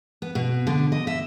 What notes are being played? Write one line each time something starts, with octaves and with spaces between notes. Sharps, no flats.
B3
B2
D3
D#5
E5